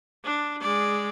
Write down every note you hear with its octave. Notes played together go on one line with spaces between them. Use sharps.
D4
G#3 D5